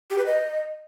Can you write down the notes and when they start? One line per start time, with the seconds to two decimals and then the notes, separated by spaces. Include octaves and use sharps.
0.10 G4
0.18 B4
0.26 D#5